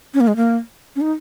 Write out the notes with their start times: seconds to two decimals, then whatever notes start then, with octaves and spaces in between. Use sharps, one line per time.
0.14 C#4
0.20 A#3
0.28 G#3
0.36 A#3
0.96 C#4
1.01 D#4